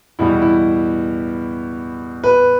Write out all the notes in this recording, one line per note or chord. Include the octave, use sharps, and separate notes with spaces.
E2 B2 G3 E4
E4
B4